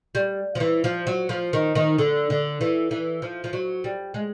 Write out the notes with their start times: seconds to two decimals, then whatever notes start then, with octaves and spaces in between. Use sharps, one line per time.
0.15 G3
0.55 F3
0.60 E3
0.84 F3
1.07 F#3
1.29 F3
1.53 D#3
1.75 D#3
1.98 D3
2.30 D3
2.61 E3
2.91 E3
3.22 F3
3.44 F3
3.53 F#3
3.84 G3
4.14 G#3